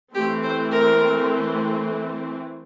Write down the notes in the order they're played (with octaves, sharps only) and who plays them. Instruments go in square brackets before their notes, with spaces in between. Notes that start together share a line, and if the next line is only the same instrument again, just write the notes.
[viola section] E3 A3 C4 [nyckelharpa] G4
[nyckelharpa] C5
A#4